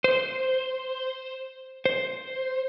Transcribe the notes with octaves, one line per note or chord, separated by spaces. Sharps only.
C5
C5